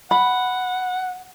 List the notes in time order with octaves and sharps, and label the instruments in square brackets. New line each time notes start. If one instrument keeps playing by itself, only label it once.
[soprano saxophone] F#5 [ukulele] B5